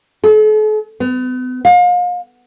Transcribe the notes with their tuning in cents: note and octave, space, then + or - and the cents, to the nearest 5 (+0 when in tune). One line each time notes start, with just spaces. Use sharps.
A4 -45
B3 +40
F5 +35